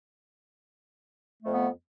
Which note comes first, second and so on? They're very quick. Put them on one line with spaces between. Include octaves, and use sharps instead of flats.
A3 F2 B3